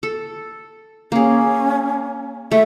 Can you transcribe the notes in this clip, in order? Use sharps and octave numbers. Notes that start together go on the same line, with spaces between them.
A4
A#3 C#4 G#4
A3 E5